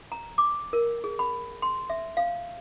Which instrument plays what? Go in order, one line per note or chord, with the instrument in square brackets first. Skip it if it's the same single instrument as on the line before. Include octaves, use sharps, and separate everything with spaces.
[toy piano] A#5
D6
A#4
G#4
B5
C6
E5
F5